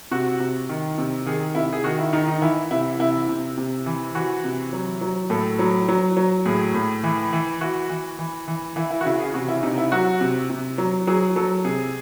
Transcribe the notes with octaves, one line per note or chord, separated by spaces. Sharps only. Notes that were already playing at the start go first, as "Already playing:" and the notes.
C3 F#4
C3
D#3
C3
D#3 G#4
C3 E4
G#4
D#3 F#4
E4
D#3 D#4
D#4
E3 E4
C3 E4
C3 E4
C3
C3
E3
E3 F#4
C3
F#3
F#3
A2 A4
F#3
F#3
F#3
A2 G#4
A2
E3
E3
E3 F#4
E3
E3
E3
E3 E4
E4
F#4
C#3 E4
G#4
C3 F#4
E4
C3 D#4
E4
F#3 F#4
C3
C3
F#3
F#3 G#4
F#3 A4
C3 G#4